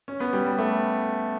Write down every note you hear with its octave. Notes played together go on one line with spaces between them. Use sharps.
C#4
B3
G3
G3
A3